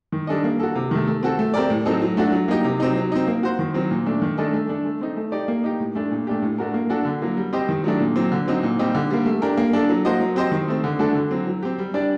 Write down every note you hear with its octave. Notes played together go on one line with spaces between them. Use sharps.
D#3
G3 D4 A4 D#5
A#3
F#4 A4
C3
D#3 A3
A3
C4 F#4 A4
A3
C4 G4 A#4 D5
A2
F#3 C4 D#4 A4
F#3
A3 D4 F#4
F#3
A#3 D#4 G4
C3
F#3 C4 D#4
F#3
C4 D#4
A#3
F#4 C5
D#3
F#3 C4
A#2
A3 D4
D#3
A3 D4 A4 D#5
A3
D4 A4
A3
C4 D#4
A3
D#4 G4 D5
A#3
D#4 G4
A2
A3 D4
A#2
A3 D4 G4
A2
A3 D4 F#4 A#4
A#3
D4 F#4 A4
D3
F#3 A#3
G3
C4 G4 C5 D#5
D#3
F#3 A3 D4
A#2
F#3 C4
D3
F#3 C4 D#4
A#2
G3 C4 D#4 G4
D3
G3 A#3
A3
D4 G4 A#4
A#3
D4 A4
F#3
A#3 F#4 C5 D#5
F#3
C4 G4 C5 D#5
D#3
A3 C4
D3
A3 D4 F#4 A4
D3
F#3 C4
F#3
C4 G4
G3
D4 G4 D5